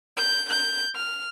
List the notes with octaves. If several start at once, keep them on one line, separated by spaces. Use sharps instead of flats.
G6
G6
F6